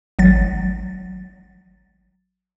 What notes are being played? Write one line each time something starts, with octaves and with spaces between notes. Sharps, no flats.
G#1 F#3 A6